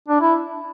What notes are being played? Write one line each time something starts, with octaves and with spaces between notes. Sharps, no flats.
D4
E4